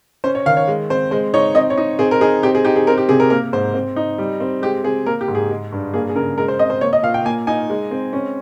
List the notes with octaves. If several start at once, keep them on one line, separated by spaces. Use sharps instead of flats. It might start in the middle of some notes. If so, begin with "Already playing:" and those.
C#4 C5
C#5
D#3 F5
C#5
G#3
C4 C5
G#3 C5
D#4 C#5
C4 D#5
C#5
D#4
C4 G#4
A#4
D#4 G#4
C4 G4
G#4
D#4 G4
G#4
C4 A#4
G4
C3 G#4
A#4
A#3 A#4
G#2 C5
C4
D#4
G3
C4
G#3 G4
C4 G#4
A#3 A#4
G4
G#2
G#4
G#3
G2
A#3 G#4
G#4
C#3 A#4
G#3 A#4
C5
C4 D#5
C5
A#3 C#5
D#5
A#2 F5
G5
A#3 G#5
D#4 G#5
G#3
C4
C#4